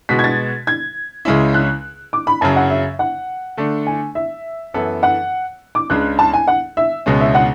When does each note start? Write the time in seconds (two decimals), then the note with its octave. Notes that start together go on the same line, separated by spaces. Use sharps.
0.09 B2 G#3 B3 F#4 B6
0.19 G#6
0.24 A6
0.67 G#6
1.25 C#2 C#3 G#3 C#4 E4
1.54 F#6
2.13 D6
2.27 B5
2.41 F#2 C#3 F#3 A5
2.56 F#5
2.70 E5
2.99 F#5
3.57 D3 A3 D4
3.87 G#5
4.15 E5
4.74 F#2 E3 B3 E4 A4
5.03 F#5
5.75 D6
5.90 C#2 C#3 G#3 D4 F#6
6.19 A5
6.34 G#5
6.48 F#5
6.77 E5
7.06 C#2 B2 G#3 C#4
7.21 E5
7.35 F#5